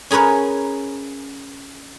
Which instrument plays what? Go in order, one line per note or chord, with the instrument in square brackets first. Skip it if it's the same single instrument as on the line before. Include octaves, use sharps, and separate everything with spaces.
[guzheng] C#4 G#4 A#4 B4 C#5